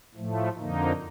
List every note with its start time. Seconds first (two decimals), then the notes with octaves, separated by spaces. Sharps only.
0.15 A2 F3 A3
0.58 F2 D3 F3 A#3 D#4